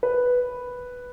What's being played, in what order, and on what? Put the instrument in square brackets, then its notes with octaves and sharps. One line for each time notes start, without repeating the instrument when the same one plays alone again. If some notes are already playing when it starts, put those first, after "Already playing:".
[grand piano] B4